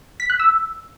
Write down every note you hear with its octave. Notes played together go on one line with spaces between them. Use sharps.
B6
F#6
E6